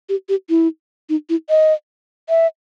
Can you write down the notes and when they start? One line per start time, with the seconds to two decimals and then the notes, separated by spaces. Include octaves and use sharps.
0.09 G4
0.29 G4
0.49 E4
1.09 D#4
1.29 E4
1.50 D#5
2.29 E5